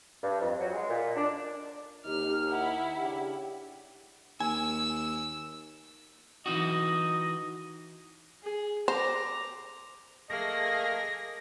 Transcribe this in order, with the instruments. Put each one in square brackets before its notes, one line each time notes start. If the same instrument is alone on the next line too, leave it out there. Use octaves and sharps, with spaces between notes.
[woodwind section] G2
F2
F#3
G#3
A#2
D4
[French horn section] D#2 D#4 [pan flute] G4 [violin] F6
[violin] E4 [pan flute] F#5
[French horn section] C#3 D4 G4
[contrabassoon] D#2 [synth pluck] G#5 [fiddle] E6
[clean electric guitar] E3 D#4 F#4 [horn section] D#5
[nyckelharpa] G#4
[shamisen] C5 [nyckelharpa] A#5 D6
[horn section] A3 A#3 [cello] G#4 [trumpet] D#5 [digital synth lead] A#6